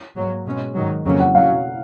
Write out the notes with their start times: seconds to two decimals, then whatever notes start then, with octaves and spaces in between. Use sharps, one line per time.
0.16 G#2 F#3 A#3
0.46 B2 G#3 C#4
0.75 G#2 D#3 F#3
1.05 F2 C#3 F#3 A#3 C#4
1.20 F#5
1.34 B2 F#3 C#4 F5